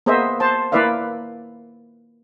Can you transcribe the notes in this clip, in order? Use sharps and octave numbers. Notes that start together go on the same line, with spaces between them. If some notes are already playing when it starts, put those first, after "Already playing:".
A#3 B3 G#4 C5 D#5 E5
C5 A5
A#3 E4 B4 D5 E5 F5